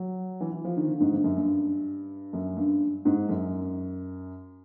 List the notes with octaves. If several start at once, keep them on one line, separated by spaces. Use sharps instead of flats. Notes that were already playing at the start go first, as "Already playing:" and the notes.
Already playing: F#3
E3
E3
F3
D#3
D3
G#2
G2
F#2
G2
F#2
G2
G#2
F#2